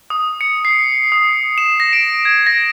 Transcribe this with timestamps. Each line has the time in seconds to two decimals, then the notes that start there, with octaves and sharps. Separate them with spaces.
0.10 D#6
0.41 C#7
0.65 C7
1.12 D#6
1.58 E7
1.80 A#6
1.93 D7
2.25 G#6
2.47 A#6